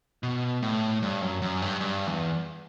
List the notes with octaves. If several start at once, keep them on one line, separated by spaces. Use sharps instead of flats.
B2
A2
G2
F#2
F#2
G2
G2
E2